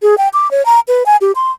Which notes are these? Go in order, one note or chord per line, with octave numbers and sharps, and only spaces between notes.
G#4
G5
D6
C#5
A#5
B4
G#5
G4
C6